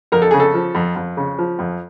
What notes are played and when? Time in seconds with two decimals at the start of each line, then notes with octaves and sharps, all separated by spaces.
0.12 F2 A#4
0.22 A4
0.31 C#3 G#4
0.40 A4
0.54 F3
0.75 F2
0.96 F2
1.17 C#3
1.38 F3
1.59 F2